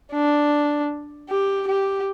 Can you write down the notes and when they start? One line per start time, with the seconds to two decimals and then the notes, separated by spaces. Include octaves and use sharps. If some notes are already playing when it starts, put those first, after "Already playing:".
0.12 D4
1.29 G4
1.67 G4